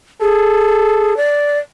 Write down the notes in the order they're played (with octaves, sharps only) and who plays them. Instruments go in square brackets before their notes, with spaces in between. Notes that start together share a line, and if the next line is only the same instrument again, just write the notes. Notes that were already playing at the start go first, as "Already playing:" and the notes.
[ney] G#4 [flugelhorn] A4
[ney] D5